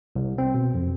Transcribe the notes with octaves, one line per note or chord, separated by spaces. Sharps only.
C2
C4
B2
F2